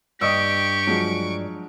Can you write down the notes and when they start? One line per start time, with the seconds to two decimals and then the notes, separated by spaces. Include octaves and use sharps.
0.21 G2 G4 D#5 C#6 D#6 E6 D7
0.87 F3 F#3 G#3